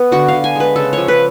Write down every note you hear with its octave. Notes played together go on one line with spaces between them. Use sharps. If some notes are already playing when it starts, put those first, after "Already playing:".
Already playing: B3
D3 F#4
D3 F5
G#5
G#3 B4
C#3 A4
F3 C#5
B4